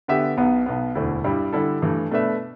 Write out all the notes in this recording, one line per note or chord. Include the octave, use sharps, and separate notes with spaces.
D3 B3 G4 E5
B1 B2 B3
B1 B2 B3
E1 D2 D3 A3 E4
G2 G3 E4
D3 G3 E4 A4
G2 E3 A3
B2 A3 D4 B4 E5